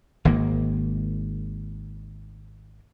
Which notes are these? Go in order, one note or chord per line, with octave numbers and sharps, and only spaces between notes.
G#1 G#2 D#3 A#3